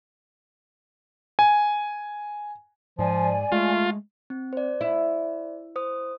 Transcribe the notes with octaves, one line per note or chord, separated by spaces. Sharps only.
G#5
G#2 F3 D5 G#5
G#3 A3 F4
C4
C5 D5
E4
C5 D#6